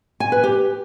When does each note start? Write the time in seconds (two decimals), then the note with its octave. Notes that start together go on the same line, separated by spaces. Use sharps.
0.20 G#5
0.32 B4
0.44 G4